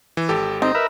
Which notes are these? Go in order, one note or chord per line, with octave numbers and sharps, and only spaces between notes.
E3
G#1 G4 A4
C4 D#4
A#4 B4 E5